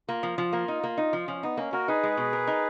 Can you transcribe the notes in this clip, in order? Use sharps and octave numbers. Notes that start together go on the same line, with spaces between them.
A#3 F4
F3
F3
A#3
D#4
A#3
D#4
F3
F3 C#4
B3 D#4
A#3 C#4
A#3 F#4 A#4
D#4 G#4 B4
G#3
B2
A#4
D#4